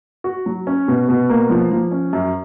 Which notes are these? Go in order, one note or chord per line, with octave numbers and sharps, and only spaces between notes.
F#4
F#3
C#4
B2
B2
A#3
F3
F3
C#4
F#2